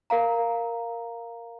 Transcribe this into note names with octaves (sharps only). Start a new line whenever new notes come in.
A#4 F5 A#5